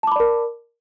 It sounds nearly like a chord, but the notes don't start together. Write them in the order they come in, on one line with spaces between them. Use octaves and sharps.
A5 D6 B5 D5 A#4